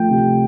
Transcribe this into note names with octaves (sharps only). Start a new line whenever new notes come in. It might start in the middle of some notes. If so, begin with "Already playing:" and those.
Already playing: F3 A3 G5
C3